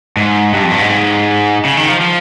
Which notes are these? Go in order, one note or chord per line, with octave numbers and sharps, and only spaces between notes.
G#2
G2
F2
G2
G#2
C#3
D#3
F3
F3